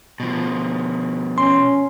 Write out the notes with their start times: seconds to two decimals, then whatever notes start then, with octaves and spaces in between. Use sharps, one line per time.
0.20 B2 F3
1.38 C#4 C6